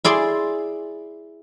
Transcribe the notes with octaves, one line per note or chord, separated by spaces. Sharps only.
E4 G#4 D5 C6